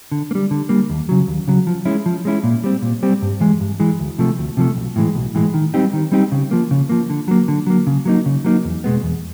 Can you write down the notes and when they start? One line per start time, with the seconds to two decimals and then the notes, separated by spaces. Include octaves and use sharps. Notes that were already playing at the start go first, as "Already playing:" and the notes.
0.12 D3
0.31 A#3
0.35 G3
0.51 D3
0.69 G3 A#3
0.90 D#2
1.09 C#3 F#3
1.28 D#2
1.48 C#3 F#3
1.67 F3
1.85 G#3 C#4 E4
2.06 F3
2.25 G#3 C#4 E4
2.44 A#2
2.64 G3 C4
2.82 A#2
3.03 G3 C4
3.22 G2
3.40 E3 G#3
3.61 G2
3.80 E3 G#3
4.00 D2
4.19 C3 F3 A3
4.38 D2
4.57 C3 F3 A3
4.76 B1
4.96 A2 E3 G#3
5.15 B1
5.35 A2 E3 G#3
5.54 D#3
5.74 G3 C4 D#4 G4
5.93 D#3
6.12 G3 C4 D#4 G4
6.32 C#3
6.51 F3 A#3
6.71 C#3
6.89 F3 A#3
7.10 D3
7.28 F#3 A#3
7.48 D3
7.67 F#3 A#3
7.87 C#3
8.05 F#3 A#3 D#4
8.26 C#3
8.44 F#3 A#3 D#4
8.65 E2
8.84 B2 G#3 B3
9.03 E2